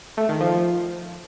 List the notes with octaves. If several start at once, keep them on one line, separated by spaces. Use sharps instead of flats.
A3
D#3
F3